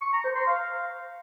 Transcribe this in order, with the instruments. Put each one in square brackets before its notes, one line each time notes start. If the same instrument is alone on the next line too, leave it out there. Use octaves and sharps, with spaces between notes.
[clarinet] C#6
A#5
C5
C6
F5